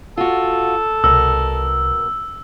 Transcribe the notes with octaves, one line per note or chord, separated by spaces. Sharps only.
F4 F#4 A4
C2 B2 A#4 E6